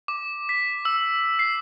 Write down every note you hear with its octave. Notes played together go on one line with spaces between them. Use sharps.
D6
B6
E6
C7